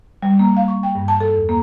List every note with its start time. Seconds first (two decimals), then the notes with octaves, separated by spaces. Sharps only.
0.22 G3
0.39 A#3
0.57 F5
0.68 C#6
0.83 G5
0.95 G2
1.08 A5
1.20 A4
1.35 E2
1.49 A#3